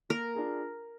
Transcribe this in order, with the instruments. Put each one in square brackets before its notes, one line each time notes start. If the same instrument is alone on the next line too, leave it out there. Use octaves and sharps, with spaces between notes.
[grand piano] A#3 [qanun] A#4
[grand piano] D4 F4 G#4